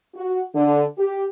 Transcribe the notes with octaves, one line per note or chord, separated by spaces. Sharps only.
F#4
D3
G4